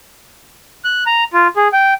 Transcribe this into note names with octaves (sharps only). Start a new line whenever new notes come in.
F#6
A#5
F4
G#4
G5